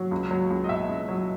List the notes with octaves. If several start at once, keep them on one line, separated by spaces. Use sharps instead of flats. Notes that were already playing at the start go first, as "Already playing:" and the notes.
Already playing: F#3
C#2
F#3
C#2
D#5
B2 E5
C#2
F#3